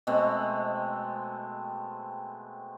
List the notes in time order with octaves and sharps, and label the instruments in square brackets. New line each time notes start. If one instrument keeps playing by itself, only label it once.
[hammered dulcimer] B2 G#3 A3 C4